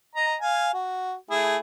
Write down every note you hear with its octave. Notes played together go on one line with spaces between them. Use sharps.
D#5 A#5
F5 G#5
F#4
A3 E4 G#4